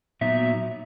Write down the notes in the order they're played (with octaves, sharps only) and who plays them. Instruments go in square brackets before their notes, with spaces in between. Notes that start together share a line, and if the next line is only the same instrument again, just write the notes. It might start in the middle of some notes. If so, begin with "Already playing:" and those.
[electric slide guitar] A#2 F#3 B3 D#4 E5